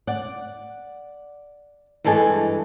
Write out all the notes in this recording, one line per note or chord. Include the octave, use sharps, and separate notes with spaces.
D5 F#5
G2 E3 G#3 A4 G#5